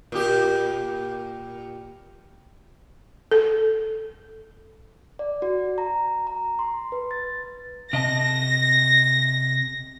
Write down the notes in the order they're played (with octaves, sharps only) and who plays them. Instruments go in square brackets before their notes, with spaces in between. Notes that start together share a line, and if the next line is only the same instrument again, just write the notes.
[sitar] A#2 G4
[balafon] A4
[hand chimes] D5
F#4
A#5
A#5
C6
B4
A6
[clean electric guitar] C3 D#5 A5 [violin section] A#6